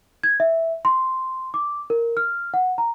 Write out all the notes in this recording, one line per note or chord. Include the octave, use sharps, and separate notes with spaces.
G#6
E5
C6
D6
A#4
F6
F#5
A#5